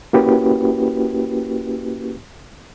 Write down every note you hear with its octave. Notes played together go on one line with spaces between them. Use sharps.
A#3 C#4 E4 F#4 G4 B4